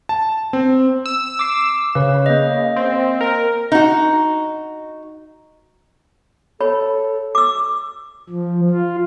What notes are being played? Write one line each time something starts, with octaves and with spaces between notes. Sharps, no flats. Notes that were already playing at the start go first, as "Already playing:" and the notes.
A5
C4
E6
D6 C7
C#3 B4
A#3 D#5
C4
A#4
D#4 F#4
A4 C#5 B5
D6 E6
F3
F4